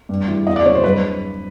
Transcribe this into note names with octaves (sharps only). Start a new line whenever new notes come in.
G2
E3 G3
E2 D#5
D5
C#3 F#3 C#5
C5
G2 B4